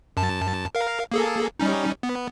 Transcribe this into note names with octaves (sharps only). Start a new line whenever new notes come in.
F#2 A5
A#4 F5
A#3 G#4 A4
G3 C#4 D#4
B3